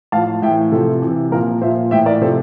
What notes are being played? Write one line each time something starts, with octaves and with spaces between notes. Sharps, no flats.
A2 F3 F5 A5
A2 E3 E5 G5
C3 F3 A4
C3 E3
A#2 F3 A#4
A#2 F3 C5 E5
A2 E3 E5 G5
A#4 D5
C3 F3 A4 C5